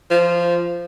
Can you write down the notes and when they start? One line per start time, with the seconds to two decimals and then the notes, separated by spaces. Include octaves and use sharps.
0.10 F3